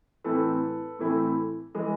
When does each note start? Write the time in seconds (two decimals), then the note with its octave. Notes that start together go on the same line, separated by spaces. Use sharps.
0.24 A2 E3 A3 C4 E4 A4 B4
0.99 A2 E3 A3 C4 E4
1.75 E3 G#3